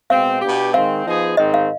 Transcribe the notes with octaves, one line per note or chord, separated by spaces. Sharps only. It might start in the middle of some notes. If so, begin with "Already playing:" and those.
B2 G#3 C4 F5
B2 B3 D4 G4
D#3 G#3 C4 F5
F3 B3 D#4 G#4
G#2 D#3 G#3 C4 D#4 D#5
F5